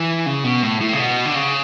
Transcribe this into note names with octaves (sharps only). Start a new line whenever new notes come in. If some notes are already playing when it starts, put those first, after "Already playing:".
Already playing: E3
C#3
B2
A2
A2
C#3
B2
D3
C#3